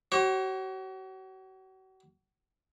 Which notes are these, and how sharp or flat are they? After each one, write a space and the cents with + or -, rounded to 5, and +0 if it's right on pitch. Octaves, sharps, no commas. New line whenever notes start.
F#4 +40 C#5 -35